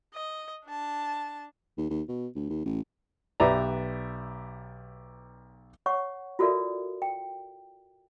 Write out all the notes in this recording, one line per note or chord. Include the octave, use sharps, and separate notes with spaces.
D#5
D4 A5
D#2
D#2
B2
D2
D#2
A1
B1 G4 B4 D5 E5 A#5
C#5 F#5 C#6
F4 F#4 A4 A#4 D5 E5
G5